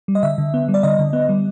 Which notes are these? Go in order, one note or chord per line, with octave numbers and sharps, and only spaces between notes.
G3
D#5
D3 E5
D3
B3
G3
D5
D3 D#5
D3
B3
G3